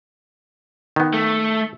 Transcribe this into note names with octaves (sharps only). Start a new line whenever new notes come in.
D#3 B3
A3